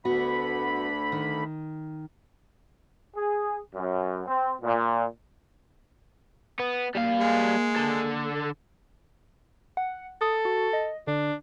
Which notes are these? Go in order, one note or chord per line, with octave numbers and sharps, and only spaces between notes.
D2 B3 F#4 B5
D#3
G#4
F#2
C4
A#2
B3
G3 A#3 F5
G#3
D3 A4
F#5
A4 D#6
F#4
D#5
D3 D4